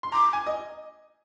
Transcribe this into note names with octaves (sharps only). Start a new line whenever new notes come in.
C6
A#5 D6
G#5
D#5